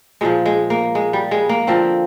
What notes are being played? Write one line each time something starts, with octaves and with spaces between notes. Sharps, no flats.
A#2 F3 G#3
G#3
A#3
G#3
G3
G#3
A#3
D3 F3 C4